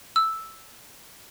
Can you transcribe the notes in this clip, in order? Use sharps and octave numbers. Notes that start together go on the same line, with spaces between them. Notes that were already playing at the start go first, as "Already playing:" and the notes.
E6